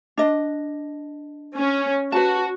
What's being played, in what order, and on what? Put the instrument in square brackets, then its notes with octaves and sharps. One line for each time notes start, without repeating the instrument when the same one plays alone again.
[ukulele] D4 D#5
[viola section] C#4
[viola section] F#4 [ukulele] B4 A5